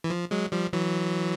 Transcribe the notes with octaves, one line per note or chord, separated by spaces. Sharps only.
E3
F3
F#3 G#3
F3 G3
E3 F#3